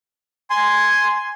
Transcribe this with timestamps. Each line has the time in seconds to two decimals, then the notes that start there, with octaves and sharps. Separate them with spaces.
0.50 G#5 C6